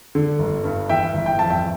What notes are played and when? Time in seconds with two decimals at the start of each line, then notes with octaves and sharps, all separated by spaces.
0.15 D3
0.39 G1
0.64 G2
0.89 E3 E5 G5
1.13 G1
1.26 G5
1.39 F2 A5
1.50 E5 G5